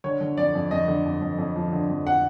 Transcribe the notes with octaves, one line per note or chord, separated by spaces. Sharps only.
D3 C#5
D3
F2 D5
F2
F2 D#5
D3
F2
F2
F2
F3
D3
F2
F#5